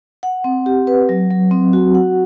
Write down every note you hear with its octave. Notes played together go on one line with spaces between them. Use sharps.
F#5
C4
G4
B4
F#3
F#3
C4
F#4
F#5